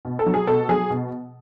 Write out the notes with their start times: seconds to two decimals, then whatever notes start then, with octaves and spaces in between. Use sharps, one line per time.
0.05 B2
0.19 A4
0.26 F#3
0.34 G#4
0.47 B2 A4
0.69 F#3 G#4
0.90 B2